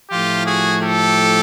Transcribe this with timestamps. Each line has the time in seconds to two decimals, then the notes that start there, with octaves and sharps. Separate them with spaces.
0.11 A2 F3 A3 F4 G4
0.46 F#4 G#4
0.82 G4 A4